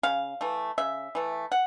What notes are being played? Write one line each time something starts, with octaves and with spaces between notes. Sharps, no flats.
C#3 F5
E3 A3
C#3 E5
E3 A3
F#5